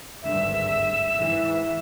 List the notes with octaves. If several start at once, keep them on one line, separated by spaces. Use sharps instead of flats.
G#1 D2 G2 E5
G#2 E3